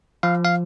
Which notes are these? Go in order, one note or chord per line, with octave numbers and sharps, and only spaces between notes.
F3 F5
F5